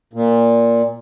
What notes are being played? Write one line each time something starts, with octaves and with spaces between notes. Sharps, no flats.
A#2